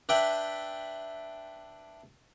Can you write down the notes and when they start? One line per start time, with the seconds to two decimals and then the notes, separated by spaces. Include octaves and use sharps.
0.09 D4 B4 D5 E5 G5